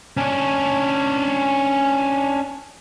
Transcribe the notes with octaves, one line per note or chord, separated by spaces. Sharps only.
C#4 D4